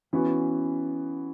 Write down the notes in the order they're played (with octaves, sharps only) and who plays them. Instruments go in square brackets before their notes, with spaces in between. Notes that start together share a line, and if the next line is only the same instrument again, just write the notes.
[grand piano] E3 B3 F#4 [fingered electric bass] C#4